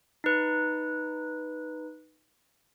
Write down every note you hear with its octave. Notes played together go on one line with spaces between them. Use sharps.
D#4 B4